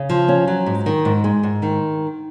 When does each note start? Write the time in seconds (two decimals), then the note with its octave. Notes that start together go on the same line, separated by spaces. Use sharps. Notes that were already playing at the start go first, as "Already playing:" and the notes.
Already playing: C#3
0.10 F3
0.28 C#4
0.48 F#3
0.66 G#2
0.86 D#3
1.05 G#2
1.24 G#3
1.43 G#2
1.62 D#3